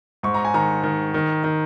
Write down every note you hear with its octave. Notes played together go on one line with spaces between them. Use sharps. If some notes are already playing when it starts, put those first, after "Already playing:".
G#2 C#6
A#5
G#5
D#3 A#5
D#3
D#3
D#3